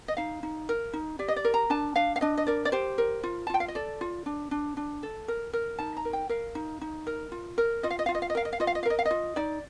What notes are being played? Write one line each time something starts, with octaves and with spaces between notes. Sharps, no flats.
D#5
D#4 F5
D#4
A#4
D#4
G4 D5
D#5
D5
A#4
A#5
D4 A5
D4 F5
F5
D4 D#5
D#5
A#4 D5
D5
G4 C5
A#4
F4
A5
F4 G5
F5
D#5
A4 D5
F4
D4
D4
D4
A4
A#4
A#4
D#4 A5
A#5
A#4
G5
A#4 F5
D#4
D#4
A#4
F4
A#4
F4 D#5
F5
D#5
F5
F4
D#5
F5
D#5
A#4 F5
D#5
F5
F4 D#5
F5
D#5
F5
A#4 D#5
F5
D#5
F4
D#4 D5